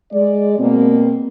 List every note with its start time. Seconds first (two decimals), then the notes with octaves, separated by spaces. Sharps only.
0.12 G#3 D5
0.59 B2 A#3 C4